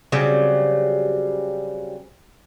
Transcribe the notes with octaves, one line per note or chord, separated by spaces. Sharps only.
C#3 F#3 G3 C4